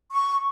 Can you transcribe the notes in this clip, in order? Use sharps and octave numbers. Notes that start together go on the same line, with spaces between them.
C#6